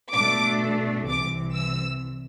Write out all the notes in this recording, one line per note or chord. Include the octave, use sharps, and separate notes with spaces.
B2 A3 D4 D6
C2 C3 E3 D6
E6